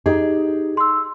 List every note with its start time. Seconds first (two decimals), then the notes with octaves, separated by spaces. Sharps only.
0.06 D#4 G4 G#4
0.77 C6 E6